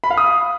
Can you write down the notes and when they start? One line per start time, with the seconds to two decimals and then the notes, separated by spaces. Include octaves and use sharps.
0.04 B5
0.11 F5
0.17 D#6